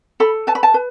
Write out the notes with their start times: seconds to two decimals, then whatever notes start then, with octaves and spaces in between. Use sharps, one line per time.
0.20 A4 B5
0.47 B4 A5
0.55 B5
0.63 A5
0.74 B4